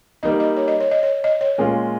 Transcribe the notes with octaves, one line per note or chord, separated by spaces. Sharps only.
G3 A#3 D#4 D#5
D#5
C#5
D#5
C#5
D#5
C#5
D#5
C#5
A#2 G#3 C#4 F4